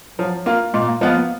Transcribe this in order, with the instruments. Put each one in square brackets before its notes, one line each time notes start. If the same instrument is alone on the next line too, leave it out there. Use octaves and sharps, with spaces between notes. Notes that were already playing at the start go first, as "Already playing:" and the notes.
[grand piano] F3 [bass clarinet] F#3
[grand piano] A#3 F4
[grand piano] A#2 [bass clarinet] G#3
[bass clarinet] A#3
[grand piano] F3 B3 F4 [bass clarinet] G#3
[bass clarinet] A#3